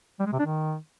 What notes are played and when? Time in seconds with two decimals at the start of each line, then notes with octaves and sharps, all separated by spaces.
0.19 G3
0.26 G#3
0.32 C3
0.39 D4
0.45 D#3